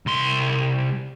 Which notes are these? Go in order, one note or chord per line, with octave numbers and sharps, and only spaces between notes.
C2 C6